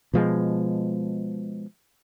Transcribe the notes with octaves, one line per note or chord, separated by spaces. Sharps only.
B2 F3 G#3